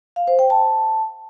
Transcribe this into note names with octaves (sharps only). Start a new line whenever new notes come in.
F5
C5
G5
A5